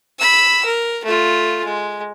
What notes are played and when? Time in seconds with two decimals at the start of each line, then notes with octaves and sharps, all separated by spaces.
0.19 B5 E6
0.65 A#4
1.05 A3 F4
1.65 G#3